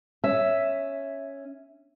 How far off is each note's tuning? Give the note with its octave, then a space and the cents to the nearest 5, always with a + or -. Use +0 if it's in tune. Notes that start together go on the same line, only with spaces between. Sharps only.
C#4 +0 E5 +0